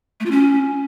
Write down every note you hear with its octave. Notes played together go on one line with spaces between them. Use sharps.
A3
F4
C#4